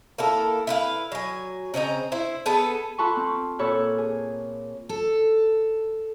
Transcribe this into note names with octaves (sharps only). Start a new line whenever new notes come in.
A#3 E4 A4
E4 B4 F5
F#3 G#5
C#3 C4 D#5 A#5
E4 C5
B3 G#4 A4 B4
F4 A4 B4 A5 B5 C#6
C4
A#2 A4 C#5 B5 F6
G#4
A4